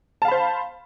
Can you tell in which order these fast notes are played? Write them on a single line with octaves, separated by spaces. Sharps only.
A5 F5 B5 C5